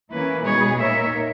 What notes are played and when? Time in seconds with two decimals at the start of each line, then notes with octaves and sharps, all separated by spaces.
0.12 E3 A#3 C#4 E4 B4
0.45 B2 G#3 D#4 G#4 B4 C#5
0.79 A#2 A#3 D#4 A#4 C#5 E5